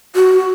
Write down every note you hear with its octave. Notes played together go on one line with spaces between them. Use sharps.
F#4